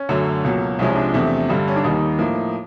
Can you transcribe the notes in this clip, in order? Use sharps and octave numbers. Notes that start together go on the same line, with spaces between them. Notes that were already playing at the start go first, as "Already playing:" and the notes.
Already playing: C#4
F#2 D3 F#3 A3
C#2 B2 F#3 A#3
C2 C3 F3 G#3 C#4
D#4
D4
E2 C3 F3 A3
G2 D3 G3
C#4
D4
D#2 D#3 G3 A#3 D#4
A2 F3 A#3